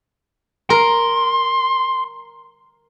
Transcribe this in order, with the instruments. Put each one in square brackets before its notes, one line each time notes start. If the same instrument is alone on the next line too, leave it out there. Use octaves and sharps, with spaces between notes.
[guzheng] A#4 [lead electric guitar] C6